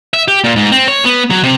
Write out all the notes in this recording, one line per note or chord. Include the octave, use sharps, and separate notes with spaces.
E5
G4
A#2
G#2
C4
C#5
B3
F#3
C3